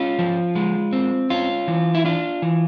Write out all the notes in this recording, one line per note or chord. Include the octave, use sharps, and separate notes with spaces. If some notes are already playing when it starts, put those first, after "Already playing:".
Already playing: C#4 F4
F3
G#3
C4
C#4 F4
E3
E4
D4 F4
E3